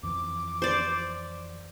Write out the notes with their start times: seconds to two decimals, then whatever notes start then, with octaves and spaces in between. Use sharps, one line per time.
0.03 F2 E3 F3 D6
0.62 C5 D5